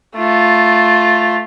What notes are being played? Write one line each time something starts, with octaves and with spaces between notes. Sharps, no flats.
A3 F4